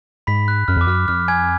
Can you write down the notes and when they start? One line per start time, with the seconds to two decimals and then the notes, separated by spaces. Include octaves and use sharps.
0.27 G#2 B5 B6
0.48 F#6
0.68 F#2 F6
0.77 F2 D6
0.87 F#2 F6
1.08 F2 F6
1.28 G#5 G#6